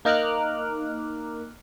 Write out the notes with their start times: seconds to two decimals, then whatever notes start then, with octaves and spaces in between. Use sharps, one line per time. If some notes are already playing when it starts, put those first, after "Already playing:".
0.05 A#3 D#4 A#4 D6 F6 F#6